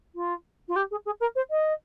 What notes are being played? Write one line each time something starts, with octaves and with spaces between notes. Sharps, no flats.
F4
F4
G4
G#4
G#4
A#4
C5
D#5